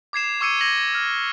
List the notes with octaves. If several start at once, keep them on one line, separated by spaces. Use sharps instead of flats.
D6 G#6 C7 E7
C#6 D6 E6 G#6 C#7 D#7
G#6 A#6 F#7
F6